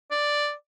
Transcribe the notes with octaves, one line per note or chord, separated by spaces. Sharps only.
D5